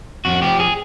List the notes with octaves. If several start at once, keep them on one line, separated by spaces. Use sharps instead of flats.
F2 F#4
F3 G4
G#4